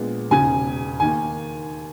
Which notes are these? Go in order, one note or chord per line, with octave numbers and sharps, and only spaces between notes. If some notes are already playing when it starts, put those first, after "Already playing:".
Already playing: A#1 A#2 G#3 B3
E1 D#2 C#3 G#5
D#2 D#3 A#3 G#5